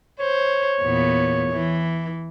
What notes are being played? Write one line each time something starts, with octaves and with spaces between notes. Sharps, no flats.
C5 C#5
E2 A#2 B3
E3